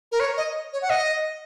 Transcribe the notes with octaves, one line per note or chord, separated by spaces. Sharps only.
A#4
C#5
D#5
C#5
F#5
D#5